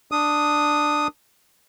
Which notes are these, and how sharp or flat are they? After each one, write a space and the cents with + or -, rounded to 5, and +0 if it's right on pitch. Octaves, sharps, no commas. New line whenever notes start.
D4 +10 D#6 +0